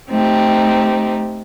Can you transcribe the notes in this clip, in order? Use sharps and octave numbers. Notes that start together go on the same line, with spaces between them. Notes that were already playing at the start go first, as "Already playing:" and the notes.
A3 C4 D#4 G4